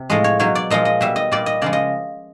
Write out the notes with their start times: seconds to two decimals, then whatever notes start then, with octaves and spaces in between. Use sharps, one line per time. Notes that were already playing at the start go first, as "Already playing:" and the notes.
Already playing: C3
0.10 A2 F3 G#3 D#5
0.24 C#5
0.39 B2 F#3 C#5
0.55 D5
0.70 A#2 F3 G#3 D#5
0.85 D#5
1.01 B2 G3 E5
1.16 D#5
1.32 A#2 G3 D5
1.46 D#5
1.62 C#3 F3 G#3 D5
1.73 D#5